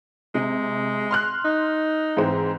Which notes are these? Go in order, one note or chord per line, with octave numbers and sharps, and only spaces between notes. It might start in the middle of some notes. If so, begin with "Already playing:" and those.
C3 G#3
C6 F6 F#6
D#4
G#2 E3 C4